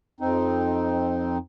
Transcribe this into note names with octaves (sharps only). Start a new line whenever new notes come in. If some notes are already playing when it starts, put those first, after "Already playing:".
F2 C4 D#4